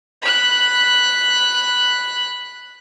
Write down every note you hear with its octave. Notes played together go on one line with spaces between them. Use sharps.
B5 F#6